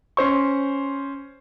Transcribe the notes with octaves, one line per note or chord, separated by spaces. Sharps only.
C#4 C5 C#6